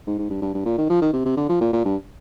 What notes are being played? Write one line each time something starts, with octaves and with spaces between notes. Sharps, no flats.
G#2
G#2
G2
G2
G2
A#2
D#3
F3
D#3
C3
C3
D3
F3
A#2
A#2
G2